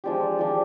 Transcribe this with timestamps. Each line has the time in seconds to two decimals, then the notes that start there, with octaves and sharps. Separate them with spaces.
0.04 F3 G#3 D4 G4
0.39 F3 G#3 D4 G4